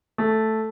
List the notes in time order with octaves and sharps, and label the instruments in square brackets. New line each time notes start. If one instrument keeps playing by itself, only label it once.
[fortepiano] A3